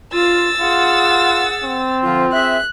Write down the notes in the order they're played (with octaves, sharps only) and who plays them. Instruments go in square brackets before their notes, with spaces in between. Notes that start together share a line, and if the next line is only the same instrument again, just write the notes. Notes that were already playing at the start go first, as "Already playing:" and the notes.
[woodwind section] F4 [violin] E6 A6
[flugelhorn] F4 [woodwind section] G#4 F#5
[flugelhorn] C4
[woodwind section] D3 F3 F4
[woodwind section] F4 G#4 E5 [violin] F#6